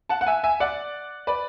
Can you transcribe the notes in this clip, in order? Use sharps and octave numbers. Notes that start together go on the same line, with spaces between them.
F#5 A5
F#5
E5 G#5
E5 G#5
D5 F#5
B4 D5